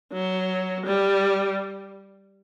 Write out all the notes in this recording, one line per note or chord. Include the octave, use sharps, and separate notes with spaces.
F#3
G3